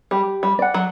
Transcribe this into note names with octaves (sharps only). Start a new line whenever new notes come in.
G3 G4
G3
D5 F#5
F#3